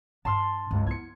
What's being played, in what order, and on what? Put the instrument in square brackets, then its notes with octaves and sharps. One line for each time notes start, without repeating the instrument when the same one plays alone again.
[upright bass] G2 D4 [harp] A5 C6 F6
[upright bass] C#2 G2
[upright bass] B3 E4 [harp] G#6 C#7